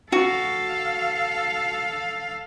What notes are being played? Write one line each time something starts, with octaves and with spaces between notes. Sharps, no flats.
F#4 A4 F5